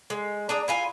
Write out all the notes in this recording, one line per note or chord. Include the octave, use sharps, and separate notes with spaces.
G#3
D4 G#4 A#5
E4 F4 G#5